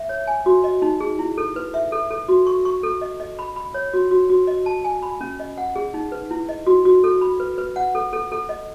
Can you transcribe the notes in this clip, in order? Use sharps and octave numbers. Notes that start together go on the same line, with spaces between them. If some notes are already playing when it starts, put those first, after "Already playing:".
Already playing: E5
C#5
G#5
F#4
D#5
D#4
G#4
E4
A4
B4
E5
A4
A4
F#4
C#6
C#6
A4
D#5
D#5
B5
B5
C#5
F#4
F#4
F#4
D#5
A5
G#5
B5
C#4
D#5
F#5
G#4
D#4
B4
E4
D#5
F#4
F#4
A4
B5
B4
B4
F#5
A4
A4
A4
D#5